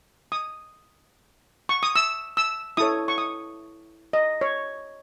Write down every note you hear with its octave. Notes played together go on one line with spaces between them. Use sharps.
D#6
C#6
D#6
E6
E6
E4 A4 C#5 D#6
C#6
D#6
D#5
C#5